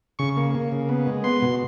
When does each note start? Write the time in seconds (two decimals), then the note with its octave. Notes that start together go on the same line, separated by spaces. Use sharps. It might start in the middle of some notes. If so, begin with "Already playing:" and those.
0.19 C#3 C#6
0.37 A#3
0.55 A#3
0.72 C#3
0.89 B3
1.07 G#3
1.24 B3 C6
1.42 B2